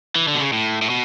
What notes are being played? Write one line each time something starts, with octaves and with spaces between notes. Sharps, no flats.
E3
D3
B2
C#3
A2
A2
B2